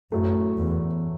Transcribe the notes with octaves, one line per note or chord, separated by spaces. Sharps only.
F#2 A2 F#3 A3
E2